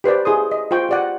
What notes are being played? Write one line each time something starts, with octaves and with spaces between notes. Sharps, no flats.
G4 B4 C5 D5
E4 G#4 C6 D#6
D#5
F4 C5 G5 C#6
G4 D5 F#5